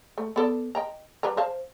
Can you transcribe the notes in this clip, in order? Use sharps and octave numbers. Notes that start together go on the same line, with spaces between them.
A3
B3 A4 D5
D#5 G5 A#5
G3 B4 A#5
C5 F5 A5